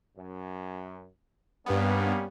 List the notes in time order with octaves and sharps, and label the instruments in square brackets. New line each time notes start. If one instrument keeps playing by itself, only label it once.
[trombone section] F#2
[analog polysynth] G2 B3 [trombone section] G3 A#3 C#4